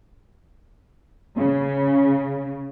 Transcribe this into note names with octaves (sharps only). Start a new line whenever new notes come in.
C#3